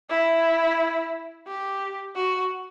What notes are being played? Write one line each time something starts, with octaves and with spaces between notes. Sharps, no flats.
E4
G4
F#4